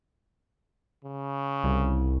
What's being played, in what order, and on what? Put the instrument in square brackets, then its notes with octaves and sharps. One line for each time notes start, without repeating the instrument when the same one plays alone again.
[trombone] C#3
[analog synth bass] C2